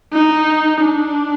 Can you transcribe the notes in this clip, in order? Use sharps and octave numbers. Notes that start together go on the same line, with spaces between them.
D#4
D4